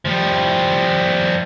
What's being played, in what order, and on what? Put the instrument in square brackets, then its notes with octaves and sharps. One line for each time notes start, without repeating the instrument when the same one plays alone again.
[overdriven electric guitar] F3 G3